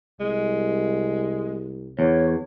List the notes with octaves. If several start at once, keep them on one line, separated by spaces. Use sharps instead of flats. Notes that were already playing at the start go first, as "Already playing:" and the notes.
C2 G#3
E2 C#5